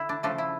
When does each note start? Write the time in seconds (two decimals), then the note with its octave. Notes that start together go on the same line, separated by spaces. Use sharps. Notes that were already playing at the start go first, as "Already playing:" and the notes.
Already playing: D3 E4
0.09 D4
0.23 C#3 F3 A3 D4
0.38 E4